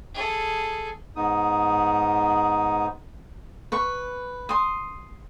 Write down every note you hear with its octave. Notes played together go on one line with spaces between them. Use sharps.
G#4 A4
G#2 B3 D#4 D#6
B4 C#6
C6 D#6